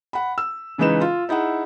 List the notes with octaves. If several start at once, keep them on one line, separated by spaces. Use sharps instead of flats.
F#5 B5
E6
C#3 E3 G#3 D#4 B4 E7
F4
D#4 E4 G#4 F#5